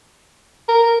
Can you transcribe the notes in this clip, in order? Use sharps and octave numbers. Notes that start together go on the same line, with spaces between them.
A#4